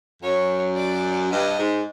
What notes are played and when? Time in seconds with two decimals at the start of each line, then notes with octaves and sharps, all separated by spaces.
0.22 F#2 C#5
0.76 D5
1.31 G2 D#5
1.58 G#2